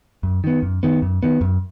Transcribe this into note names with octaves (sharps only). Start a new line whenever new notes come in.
F#2
D#3 B3
F#2
D#3 B3
F#2
D#3 B3
F#2